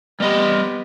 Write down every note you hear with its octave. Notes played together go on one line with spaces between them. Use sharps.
G3 B3 G4 D#5